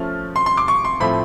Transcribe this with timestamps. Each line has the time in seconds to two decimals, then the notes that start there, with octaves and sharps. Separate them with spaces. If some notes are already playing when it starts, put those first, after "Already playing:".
Already playing: F3 A3 C#4 F6
0.36 C6
0.46 C6
0.57 D6
0.68 C#6
0.85 C6
1.00 A2 F3 A3 C4 B5